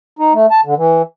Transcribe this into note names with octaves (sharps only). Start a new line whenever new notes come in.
D#4
A3
A5
D3
E3